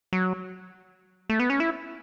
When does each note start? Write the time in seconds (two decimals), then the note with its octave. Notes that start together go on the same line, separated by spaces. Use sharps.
0.13 F#3
1.29 A3
1.40 B3
1.50 C#4
1.60 E4